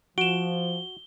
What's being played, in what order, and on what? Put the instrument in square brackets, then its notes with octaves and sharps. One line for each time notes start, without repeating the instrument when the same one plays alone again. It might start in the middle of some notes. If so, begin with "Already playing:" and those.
[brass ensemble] F3 [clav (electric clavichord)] F#4 [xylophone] D7 E7 [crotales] G7